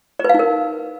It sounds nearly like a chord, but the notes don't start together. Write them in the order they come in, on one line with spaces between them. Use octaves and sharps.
D5 B4 F5 D#4 A#4